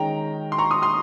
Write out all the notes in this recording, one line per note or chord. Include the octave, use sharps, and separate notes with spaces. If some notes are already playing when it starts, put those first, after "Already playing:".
Already playing: D#3 G#3 C#4 G5 A#5
C6
A#5 C#6
C6 D#6
C6 D#6